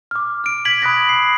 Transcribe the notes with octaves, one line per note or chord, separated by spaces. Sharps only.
D6 F6
F6 D7
G#6 B6 D7 F#7
B5 D#6 F#6 G#6 A#6 B6
C7